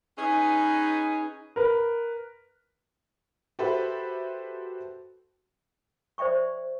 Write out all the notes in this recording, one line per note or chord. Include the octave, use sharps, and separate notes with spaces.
C#4 D#4 G#4 B4
A#4 B4
F#4 G4 A4 B4 C5 E5
C5 D5 E5 G5 C#6